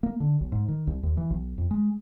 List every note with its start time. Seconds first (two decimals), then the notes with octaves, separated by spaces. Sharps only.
0.03 A#3
0.20 D3
0.41 B1
0.52 G#2
0.68 D#3
0.87 C2
1.03 D#2
1.17 E3
1.30 B1
1.58 F2
1.71 G#3